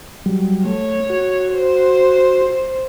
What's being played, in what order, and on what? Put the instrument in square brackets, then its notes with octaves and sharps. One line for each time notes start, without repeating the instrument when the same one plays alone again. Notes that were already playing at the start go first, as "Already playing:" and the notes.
[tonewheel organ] F#3 G3
[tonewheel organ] A3 [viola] C#5
[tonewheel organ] F#4
[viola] C5